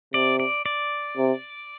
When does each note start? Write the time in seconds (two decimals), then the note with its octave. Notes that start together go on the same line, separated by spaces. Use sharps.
0.13 C3 D5
0.40 D5
0.66 D5
1.17 C3